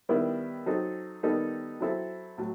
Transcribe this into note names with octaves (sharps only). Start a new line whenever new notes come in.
D#3 G3 B3 E4
F#3 C4 D#4 A4
D#3 G3 B3 D#4 A4
F#3 C4 E4 A4
A2 F#3